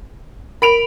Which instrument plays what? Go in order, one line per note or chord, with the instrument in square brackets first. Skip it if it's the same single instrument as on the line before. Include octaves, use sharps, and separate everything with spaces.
[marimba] A#4 [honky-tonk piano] B5 D7 F7